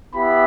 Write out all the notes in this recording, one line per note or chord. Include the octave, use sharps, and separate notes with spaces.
B3 E4 G4 B5